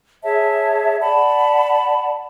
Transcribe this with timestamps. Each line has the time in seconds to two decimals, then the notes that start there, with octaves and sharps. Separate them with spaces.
0.23 G#4 C#5 E5 A5
1.00 D5 F#5 A5 B5